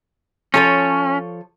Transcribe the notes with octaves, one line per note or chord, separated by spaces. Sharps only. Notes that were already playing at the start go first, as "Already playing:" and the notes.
F3 C#4 A4 C#5